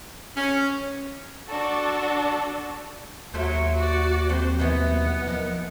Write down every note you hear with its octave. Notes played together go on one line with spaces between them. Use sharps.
C#4
D4 F#4 A4
D#2 F#3 A3 C5
F#4 D5
F2 C5
B2 E3 F#3 B3
F3 D#4 A#4